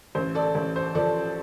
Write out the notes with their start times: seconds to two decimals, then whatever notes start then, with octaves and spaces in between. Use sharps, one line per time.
0.15 A1 C5
0.35 A4 D5
0.55 A1
0.76 C5
0.95 F3 A4 D5